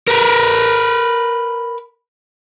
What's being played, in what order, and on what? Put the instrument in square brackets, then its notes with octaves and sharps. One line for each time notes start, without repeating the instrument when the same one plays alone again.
[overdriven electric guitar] A#4 B4